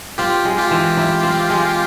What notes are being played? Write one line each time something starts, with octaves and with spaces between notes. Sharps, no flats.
C4 F4 G4
G#3
F4 G4
E3
E4
C4
G#3